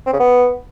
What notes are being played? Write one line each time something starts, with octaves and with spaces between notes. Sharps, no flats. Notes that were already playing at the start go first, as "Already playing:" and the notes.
C4
C#3
B3